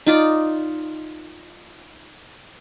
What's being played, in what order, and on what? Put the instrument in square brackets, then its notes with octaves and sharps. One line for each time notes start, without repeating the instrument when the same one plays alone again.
[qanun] D#4 F4 D5